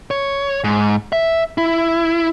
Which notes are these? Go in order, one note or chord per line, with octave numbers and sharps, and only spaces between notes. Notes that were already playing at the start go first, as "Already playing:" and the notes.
C#5
G#2
E5
E4